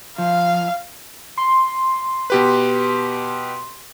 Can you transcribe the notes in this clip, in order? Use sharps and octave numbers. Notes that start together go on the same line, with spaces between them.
F3 F5
C6
B2 G4 B4